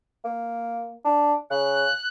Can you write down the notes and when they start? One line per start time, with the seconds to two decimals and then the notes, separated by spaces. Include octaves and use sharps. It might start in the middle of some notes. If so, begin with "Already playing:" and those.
0.25 A#3
1.05 D4
1.51 C#3 F#6